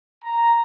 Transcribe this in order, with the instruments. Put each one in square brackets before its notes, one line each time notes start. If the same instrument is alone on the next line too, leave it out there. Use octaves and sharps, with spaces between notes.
[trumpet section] A#5